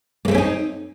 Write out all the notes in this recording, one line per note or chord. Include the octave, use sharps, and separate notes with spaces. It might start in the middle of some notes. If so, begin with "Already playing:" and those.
A3 A#3 C4 C#4 D#4